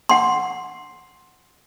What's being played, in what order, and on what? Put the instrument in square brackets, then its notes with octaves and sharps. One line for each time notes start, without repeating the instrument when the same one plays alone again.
[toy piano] F#5 C6